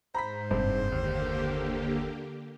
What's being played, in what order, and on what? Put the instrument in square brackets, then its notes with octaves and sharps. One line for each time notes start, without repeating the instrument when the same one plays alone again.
[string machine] G#2 [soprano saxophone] C5 [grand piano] A#5 B5 B6
[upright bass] F#1 [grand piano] G2 C3 C4
[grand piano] D#2 [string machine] D3 A#3 G4